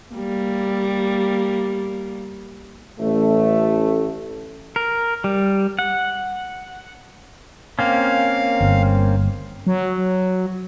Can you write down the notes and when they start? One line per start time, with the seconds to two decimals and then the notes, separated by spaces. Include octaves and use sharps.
0.13 G3 A#3
3.00 A1 A3
4.76 A#4
5.24 G3
5.79 F#5
7.79 A#3 C4 C#4 F5
8.61 G1
9.67 F#3